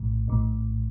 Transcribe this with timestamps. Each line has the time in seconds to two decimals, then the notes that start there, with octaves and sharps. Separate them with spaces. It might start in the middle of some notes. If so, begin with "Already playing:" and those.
Already playing: A#1 A2
0.28 A#1 A2